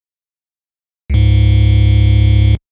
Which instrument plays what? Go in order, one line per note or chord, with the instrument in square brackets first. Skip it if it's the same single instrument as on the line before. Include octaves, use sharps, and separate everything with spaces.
[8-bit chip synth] C#2 G#2